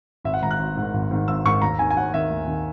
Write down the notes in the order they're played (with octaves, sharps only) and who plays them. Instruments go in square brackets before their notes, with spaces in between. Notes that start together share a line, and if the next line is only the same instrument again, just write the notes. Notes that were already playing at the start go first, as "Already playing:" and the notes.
[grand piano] G#1 E5
F#5
G#2 D#3 A#5
F#6
G#1
G#2 D#3
G#1
G#2 D#3
G#1 E6
G#2 D#3 C#6
D#2 A#5
D#3 G#5
G#5
D#2 F#5
D#3 E5
D#2
D#3